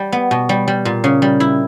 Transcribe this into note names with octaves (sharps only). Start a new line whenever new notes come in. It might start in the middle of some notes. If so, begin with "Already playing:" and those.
Already playing: G3
B3
B2
G3
G3
A#2
C#3
G3
E4